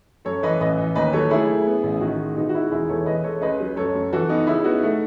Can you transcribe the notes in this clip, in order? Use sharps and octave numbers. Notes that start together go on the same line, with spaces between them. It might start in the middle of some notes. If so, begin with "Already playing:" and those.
F#2 A4 C#5
E3 B4 D#5
A1 B4 D#5
E3
D#2 B4 D#5
F#3 A4 C#5
A3 E4 G#4
C#3
B3
A1
D#3 D#4 F#4
G#3
B2 D#4
F#4
G#3 E4
E1 E4 G#4
E2 A4 C#5
E2 B4 D#5
G#3 A4 C#5
C#2 B4 D#5
F#3
F#2 A4 C#5
F#2
E3 F#4 A4
B3 D#4
C#3 E4
B3 D#4 F#4
A3